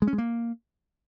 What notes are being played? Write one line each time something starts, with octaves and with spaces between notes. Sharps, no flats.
G#3
C#4
G#3
A#3